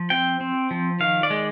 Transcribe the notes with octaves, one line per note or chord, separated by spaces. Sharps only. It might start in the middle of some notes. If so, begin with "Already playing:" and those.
Already playing: F3
C4 G5
C4
F3
D#3 F5
D5
G#3